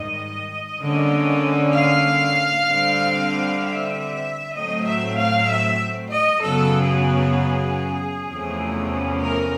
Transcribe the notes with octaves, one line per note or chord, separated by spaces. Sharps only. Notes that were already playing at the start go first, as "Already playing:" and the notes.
Already playing: G#2 D#3 G3 D#5
D3 G3 A#3 C#4
F5
D3 G3 C4
E5
A2 F#3 A3 C4 D#5
E5
F5
E5
D#5
F#2 C#3 F#3 B3 A4
G#4
E2 C3 F3 A3 C#4
A#4